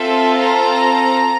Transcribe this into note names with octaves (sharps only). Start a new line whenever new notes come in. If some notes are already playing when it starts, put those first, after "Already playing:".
Already playing: C4 F4 A4 E5
A#5